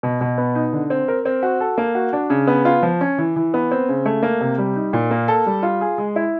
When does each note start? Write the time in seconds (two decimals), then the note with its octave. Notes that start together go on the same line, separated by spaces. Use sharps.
0.03 B2
0.21 B2
0.38 B3
0.55 D#4
0.73 D3
0.90 C4
1.08 A#4
1.25 C4
1.43 F#4
1.60 A4
1.78 A#3
1.95 F#4
2.13 D4
2.30 C#3
2.47 B3
2.65 F4
2.83 F3
3.01 C#4
3.18 E3
3.36 E3
3.54 B3
3.71 C4
3.89 C#3
4.06 A3
4.23 A#3
4.41 C3
4.58 G3
4.76 D#4
4.93 A#2
5.11 A#3
5.28 A4
5.46 G3
5.63 F4
5.81 G#4
5.98 G#3
6.16 E4